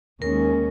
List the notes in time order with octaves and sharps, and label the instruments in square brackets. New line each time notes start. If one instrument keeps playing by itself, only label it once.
[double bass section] D#2 D#3 G#3 C#4 [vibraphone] A#4